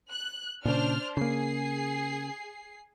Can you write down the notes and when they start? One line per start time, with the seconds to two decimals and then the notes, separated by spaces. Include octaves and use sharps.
0.11 F#6
0.65 A#2 C#3 D4 C5 F6
1.17 C#3 A#3 G#4 C7